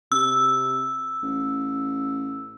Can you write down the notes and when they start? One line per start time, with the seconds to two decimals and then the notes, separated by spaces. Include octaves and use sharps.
0.12 C3 E6
1.22 A1